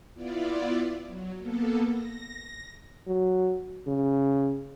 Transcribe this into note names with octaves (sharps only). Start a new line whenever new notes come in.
B3 E4 F4 D5
F#3
A#3 B3 A4
A#6
F#3
C#3